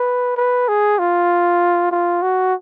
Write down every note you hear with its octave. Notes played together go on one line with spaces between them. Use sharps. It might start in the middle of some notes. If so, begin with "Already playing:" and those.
Already playing: B4
B4
G#4
F4
F4
F#4